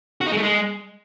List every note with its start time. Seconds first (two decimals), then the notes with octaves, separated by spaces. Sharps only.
0.21 F#4
0.26 D#4
0.32 G#3
0.37 A3
0.43 G#3